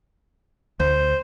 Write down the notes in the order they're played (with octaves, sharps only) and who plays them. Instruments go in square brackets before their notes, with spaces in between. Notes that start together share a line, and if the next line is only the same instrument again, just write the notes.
[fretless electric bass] D2 [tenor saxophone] C5